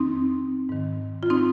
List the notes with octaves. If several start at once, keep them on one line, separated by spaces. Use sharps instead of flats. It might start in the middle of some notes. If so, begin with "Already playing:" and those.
Already playing: F2 D#3 C4 D#4
G#2 D#3
F4
C4 D#4